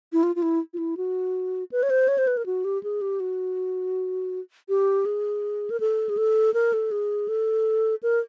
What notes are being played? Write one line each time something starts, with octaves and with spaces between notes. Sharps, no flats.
E4
F4
F4
E4
F4
E4
F#4
B4
C#5
C5
C#5
C5
B4
A#4
F#4
G4
G#4
G4
F#4
G4
G#4
A#4
A4
G#4
A4
A#4
A4
G#4
A4
A#4